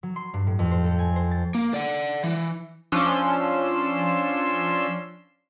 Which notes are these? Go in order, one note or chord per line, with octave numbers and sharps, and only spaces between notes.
F#3
C6
G2
A2
F2
C5
A4
G#5
C5
A6
A#3
D5 F#5
E3
F3 C#4 D4 C6 E6